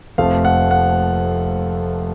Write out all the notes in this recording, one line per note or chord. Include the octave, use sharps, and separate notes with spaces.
F1 F2 F3 A3 F5
F#5
F#5